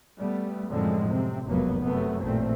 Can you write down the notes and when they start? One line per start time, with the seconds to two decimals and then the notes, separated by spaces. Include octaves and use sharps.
0.19 G3 A3 B3
0.70 F#2 A2 D3 F3 G#3 C4
1.10 C3 C4
1.47 F1 C#2 F#2 F#3 A#3 B3
1.83 F#2 C3 F#3 A3 B3
2.23 A1 A#2 A3 C4